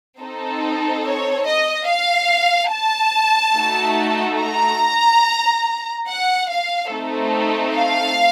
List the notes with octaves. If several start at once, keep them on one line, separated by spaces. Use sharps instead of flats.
C4 D#4 A4
C#5
D#5
F5
A5
A3 D#4 F#4 A4
A#5
F#5
F5
A3 C4 D#4 A4
F5